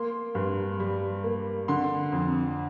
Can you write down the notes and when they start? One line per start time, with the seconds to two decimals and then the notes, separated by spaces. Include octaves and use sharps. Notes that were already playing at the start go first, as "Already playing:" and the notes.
Already playing: A#3 C6
0.35 G2
0.80 G3
1.24 A#3
1.68 D3 C6
2.12 F2